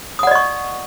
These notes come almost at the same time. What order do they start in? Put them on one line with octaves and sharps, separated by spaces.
D#6 F#5 D5 D#5 C#6